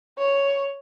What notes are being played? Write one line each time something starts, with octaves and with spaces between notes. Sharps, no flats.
C#5